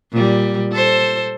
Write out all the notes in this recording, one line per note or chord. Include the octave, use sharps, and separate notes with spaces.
A#2 G3
A4 C5